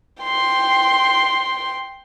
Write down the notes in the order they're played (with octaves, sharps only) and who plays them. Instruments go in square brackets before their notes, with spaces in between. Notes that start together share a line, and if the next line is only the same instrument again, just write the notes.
[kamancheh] G5 C6